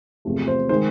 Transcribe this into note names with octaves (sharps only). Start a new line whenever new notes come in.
E2 C3 F3 A3
C5
D#3 G#3 C5